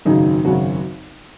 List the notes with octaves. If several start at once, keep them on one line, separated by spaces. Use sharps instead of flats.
G#1 F#2 C#3 F#3 D#4
G#1 F#2 C#3 F#3 F#4